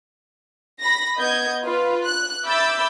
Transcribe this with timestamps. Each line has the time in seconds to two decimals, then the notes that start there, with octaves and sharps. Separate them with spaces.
0.81 B5 A#6
1.18 B3 D#5 G6 G#6
1.64 F4 B4
2.05 F#6
2.46 E5 B5 D6 E6 G6 A6